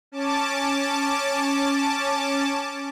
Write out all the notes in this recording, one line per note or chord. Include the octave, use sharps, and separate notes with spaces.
C#4 A5 D6